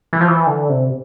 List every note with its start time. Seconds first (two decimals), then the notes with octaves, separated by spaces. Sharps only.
0.13 E3
0.21 F3
0.28 E3
0.47 D3
0.69 C3